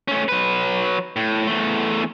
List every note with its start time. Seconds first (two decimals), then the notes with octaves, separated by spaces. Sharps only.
0.08 A3 C#4
0.28 F#3 B4
1.16 A2
1.47 E2 A3